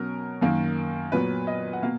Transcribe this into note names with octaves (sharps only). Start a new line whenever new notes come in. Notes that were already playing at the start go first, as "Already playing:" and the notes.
Already playing: B2 F#3 C#4 A#4
F#2 D#3 A#3
A#2 F#3 B3 B4
D#5
F#5
B2 A#3 F5